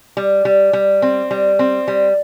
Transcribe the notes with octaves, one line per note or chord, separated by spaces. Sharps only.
G3
G3
G3
C4
G3
C4
G3